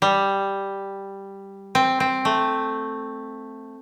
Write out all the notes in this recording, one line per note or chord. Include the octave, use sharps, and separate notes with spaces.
G3
C4
C4
A3